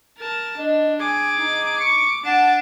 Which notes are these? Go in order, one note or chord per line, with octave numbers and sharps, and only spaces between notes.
A#4 A5
D4 D#5
G#4 G#5 D6
D#4
C#6
D4 F#5 A5